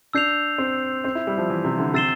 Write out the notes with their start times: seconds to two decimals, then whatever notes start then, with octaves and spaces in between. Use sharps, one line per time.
0.13 D4 E6 G6 C7 F7
0.58 C4
1.04 C4
1.15 E4
1.27 G3
1.38 F3
1.50 E3
1.64 C3
1.78 D3
1.94 C3 E6 A6 C7 E7 G7